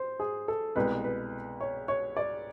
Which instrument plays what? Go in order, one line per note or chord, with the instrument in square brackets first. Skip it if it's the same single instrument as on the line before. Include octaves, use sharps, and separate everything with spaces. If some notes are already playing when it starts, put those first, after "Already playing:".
Already playing: [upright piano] C5
G#4
A4
C2 B2 G#3 B4
B4
C#5
C#5
D5